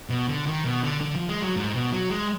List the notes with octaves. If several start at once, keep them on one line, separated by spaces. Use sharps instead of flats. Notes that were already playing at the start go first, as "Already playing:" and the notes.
B2
D3
D#3
B2
D3
D3
F3
G#3
F#3
G#2
B2
F#3
G#3